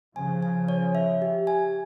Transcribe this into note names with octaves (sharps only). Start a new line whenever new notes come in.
C#3 F3 G#5
G#5
C#5
E5
G4
G#5